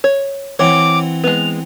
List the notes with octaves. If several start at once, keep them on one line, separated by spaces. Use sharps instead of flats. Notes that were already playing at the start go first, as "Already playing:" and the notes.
C#5
E3 C4 C#5 F#5 D6
G#3 B3 F7